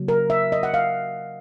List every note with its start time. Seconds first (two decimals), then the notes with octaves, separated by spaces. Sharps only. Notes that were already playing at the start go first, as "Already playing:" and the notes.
Already playing: C#3 F#3 A#3
0.08 A#4
0.30 E5
0.52 D#5
0.63 F#5
0.74 F5